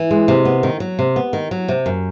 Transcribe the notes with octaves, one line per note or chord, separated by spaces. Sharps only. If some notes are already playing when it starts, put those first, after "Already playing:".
Already playing: E3
G#3
C3
B3
D#3
F#3
C3
B3
D#3
F#3
C3
F#2